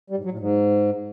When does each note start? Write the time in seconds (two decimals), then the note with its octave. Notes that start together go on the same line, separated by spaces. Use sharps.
0.10 G3
0.17 G#2
0.25 F#3
0.32 A2
0.39 G#2